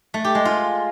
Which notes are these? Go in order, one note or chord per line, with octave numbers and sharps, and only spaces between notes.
A3
G4
G#3
F4